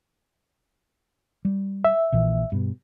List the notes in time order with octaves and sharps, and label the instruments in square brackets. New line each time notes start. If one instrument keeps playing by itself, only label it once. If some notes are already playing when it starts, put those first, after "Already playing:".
[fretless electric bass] G3
[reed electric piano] E5
[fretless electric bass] A#1 A#2 E3
G2 B2